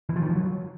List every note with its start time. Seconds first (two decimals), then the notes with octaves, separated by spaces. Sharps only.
0.09 E3
0.16 F3
0.22 D#3
0.29 F3
0.36 F#3